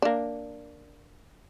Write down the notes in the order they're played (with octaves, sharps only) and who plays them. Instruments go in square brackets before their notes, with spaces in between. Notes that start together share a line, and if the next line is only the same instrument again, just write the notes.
[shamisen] A#3 D4